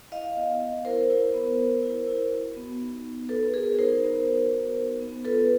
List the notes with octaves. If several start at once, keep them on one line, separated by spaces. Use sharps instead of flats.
E4 D#5 F5
B3
B3
E4 A#4 C5
E4
B3
B3
E4
E4
F#4
B3
D#4
B3
F#4 A4 B4
B3 G#4 A#4
D#4 A#4 C5
B3
F#4
B3
D#4
B3
F4 A4 B4